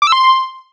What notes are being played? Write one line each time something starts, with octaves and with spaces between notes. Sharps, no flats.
D6
E6
C6